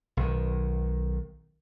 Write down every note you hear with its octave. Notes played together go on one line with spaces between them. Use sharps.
B1 D#3